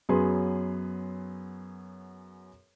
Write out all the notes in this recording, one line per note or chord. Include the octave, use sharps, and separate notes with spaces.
F#2 F#3 B3 G#4 B4 C6